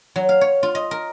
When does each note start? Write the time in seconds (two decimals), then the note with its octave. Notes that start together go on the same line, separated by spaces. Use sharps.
0.16 F#3
0.29 F5
0.41 C#5
0.63 F4
0.75 D#5
0.91 A#4